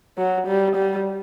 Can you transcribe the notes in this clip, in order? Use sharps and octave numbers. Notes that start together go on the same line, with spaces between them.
F#3
G3
G3